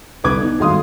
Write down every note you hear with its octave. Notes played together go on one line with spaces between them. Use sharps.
C2 D3 B4 D6 G#6
B3 D#4
G#1 G2 A3 F5 C6 D#6